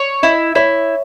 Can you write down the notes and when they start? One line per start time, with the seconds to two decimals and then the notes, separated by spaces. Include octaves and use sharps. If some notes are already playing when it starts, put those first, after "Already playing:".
Already playing: C#5
0.23 E4 D#5
0.55 E4 C#5